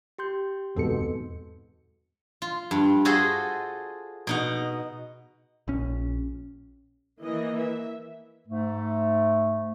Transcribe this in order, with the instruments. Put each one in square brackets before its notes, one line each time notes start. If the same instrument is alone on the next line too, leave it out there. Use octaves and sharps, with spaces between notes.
[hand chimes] G4 C6 G6
[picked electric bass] D1 G#2 C4 [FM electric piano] E2 A4 C#7 [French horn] B2
[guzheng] F4
G2
F4 F#4 G#4 A4 C5 D#5
B2 D#4 F#5
[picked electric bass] A#1 C#4
[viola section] E3 A#3 D#5
E5
[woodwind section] G#2 A3